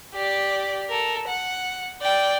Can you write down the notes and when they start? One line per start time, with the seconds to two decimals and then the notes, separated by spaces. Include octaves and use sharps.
0.15 G4 D5
0.89 A4 A#4
1.27 F#5
2.01 D5 G5